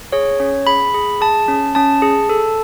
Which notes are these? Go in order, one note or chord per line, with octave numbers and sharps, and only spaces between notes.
G#4 C#5
C#4
G#4 B5
G#4
G#4 A5
C#4
C#4 A5
G#4
A4